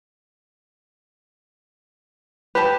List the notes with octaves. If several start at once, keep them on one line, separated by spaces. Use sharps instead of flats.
G4 B4 A5